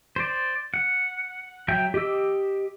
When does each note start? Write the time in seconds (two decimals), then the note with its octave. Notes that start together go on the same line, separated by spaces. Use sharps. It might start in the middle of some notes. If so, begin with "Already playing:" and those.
0.16 C5 D5
0.74 F#5
1.68 F#3 E5 G5 G6
1.94 G4 D#5 D6 E6